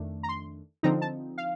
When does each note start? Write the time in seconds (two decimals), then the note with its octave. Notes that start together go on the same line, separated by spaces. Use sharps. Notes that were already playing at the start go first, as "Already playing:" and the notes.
Already playing: F2 D#3 A3 D4
0.23 A#5
0.29 C6
0.83 D3 F3 C4 D#4 A#5
1.02 A5
1.38 F5